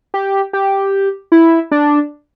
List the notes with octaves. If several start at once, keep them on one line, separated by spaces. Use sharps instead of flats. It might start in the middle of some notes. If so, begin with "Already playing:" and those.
G4
G4
E4
D4